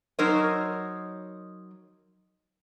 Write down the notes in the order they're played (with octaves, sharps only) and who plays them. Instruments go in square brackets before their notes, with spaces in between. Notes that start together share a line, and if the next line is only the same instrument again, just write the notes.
[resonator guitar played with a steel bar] F#3 D#4 A#4 C5 C#5 D#5